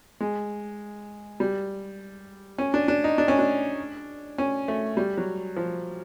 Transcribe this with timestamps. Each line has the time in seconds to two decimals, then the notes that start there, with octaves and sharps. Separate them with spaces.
0.20 G#3
1.40 G3
2.58 C#4
2.74 D4
2.88 D4
3.04 D#4
3.18 D4
3.28 C#4
3.39 D4
4.38 C#4
4.68 A3
4.97 G3
5.17 F#3
5.56 F3